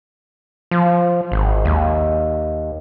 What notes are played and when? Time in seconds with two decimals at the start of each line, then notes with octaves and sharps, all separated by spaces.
0.71 F3
1.32 G#1
1.65 D#2